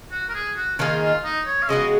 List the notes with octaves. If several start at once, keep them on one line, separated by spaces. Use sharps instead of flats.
F#4
A#4
G#4
F#4
D#3 A#3 D#4 F4 G#4
F4
D#4
C#5
F5
C#3 G#3 B3 F#4 D#5